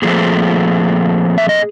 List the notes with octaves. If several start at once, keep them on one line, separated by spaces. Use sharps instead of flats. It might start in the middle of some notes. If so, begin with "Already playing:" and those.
A#2 F3 A3 C4 G#4
E5
D#5